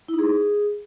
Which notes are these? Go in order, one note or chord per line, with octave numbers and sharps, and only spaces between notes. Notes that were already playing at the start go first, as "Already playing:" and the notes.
E4
D#4
G#4